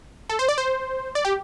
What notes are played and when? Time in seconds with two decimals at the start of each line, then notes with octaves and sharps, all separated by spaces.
0.29 A4
0.39 C5
0.49 D5
0.58 C5
1.15 D5
1.25 G4